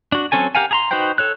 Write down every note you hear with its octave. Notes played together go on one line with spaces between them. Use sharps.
D4 F#4
F#3 C4 C#4 A4 G#5
G4 A#4 F5 F#5 G#5
G#4 A#5 C6
D#4 F#4 B4 C5 G5
A4 C#5 F#6